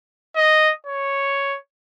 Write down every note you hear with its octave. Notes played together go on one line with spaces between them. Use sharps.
D#5
C#5